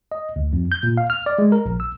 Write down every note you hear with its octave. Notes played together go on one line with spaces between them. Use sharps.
D#5
D2
F2
G6
A#2
F5
F6
D5
G#3
A#4
A#1
E6